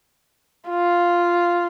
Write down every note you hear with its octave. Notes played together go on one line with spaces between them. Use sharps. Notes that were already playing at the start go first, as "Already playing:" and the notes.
F4